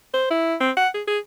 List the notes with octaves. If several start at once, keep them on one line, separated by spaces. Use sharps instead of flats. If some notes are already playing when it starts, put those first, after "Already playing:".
C5
E4
C4
F#5
G#4
G#4